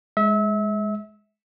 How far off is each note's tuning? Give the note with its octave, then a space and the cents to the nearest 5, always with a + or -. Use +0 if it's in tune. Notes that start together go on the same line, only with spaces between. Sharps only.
G#3 +0 E5 -30